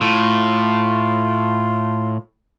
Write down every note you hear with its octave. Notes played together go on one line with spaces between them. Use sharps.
A2 F4